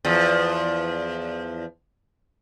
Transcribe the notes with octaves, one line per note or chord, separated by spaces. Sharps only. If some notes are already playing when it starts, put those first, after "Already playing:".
E2 F3